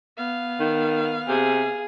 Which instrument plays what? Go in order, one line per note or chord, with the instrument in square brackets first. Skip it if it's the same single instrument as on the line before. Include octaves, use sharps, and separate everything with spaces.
[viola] B3 F5
[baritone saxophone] D#3
[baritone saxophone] C3 [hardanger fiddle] G#4